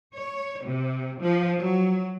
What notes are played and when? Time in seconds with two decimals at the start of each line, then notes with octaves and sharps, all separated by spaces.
0.13 C#5
0.64 C3
1.21 F3
1.57 F#3